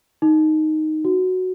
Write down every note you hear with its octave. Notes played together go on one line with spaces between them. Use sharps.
D#4
F#4